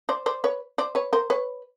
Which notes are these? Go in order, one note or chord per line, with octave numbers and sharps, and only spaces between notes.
C5 D5
C5 D5
B4 C#5
C5 D5
B4 C#5
A#4 C5
B4 C#5